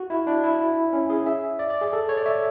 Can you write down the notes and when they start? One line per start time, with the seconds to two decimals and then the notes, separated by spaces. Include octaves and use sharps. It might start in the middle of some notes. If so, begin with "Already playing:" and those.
Already playing: F#4
0.10 E4
0.27 D4
0.43 E4
0.93 C#4
1.10 G#4
1.26 E5
1.59 D5
1.70 D5
1.81 G#4
1.93 A4
2.09 C#5
2.17 D5
2.26 E5